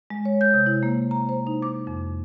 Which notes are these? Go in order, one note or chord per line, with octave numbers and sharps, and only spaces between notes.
G#3
C#5
G6
C3
E4
A#3
A#5
C5
D#4
D6
F2